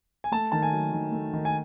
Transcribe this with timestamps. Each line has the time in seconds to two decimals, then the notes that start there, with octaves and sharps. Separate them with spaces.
0.24 G#5
0.32 A3 A5
0.52 D#3 A5
0.62 G#5
0.73 F#3
0.92 D#3
1.12 A3
1.33 D#3
1.45 G#5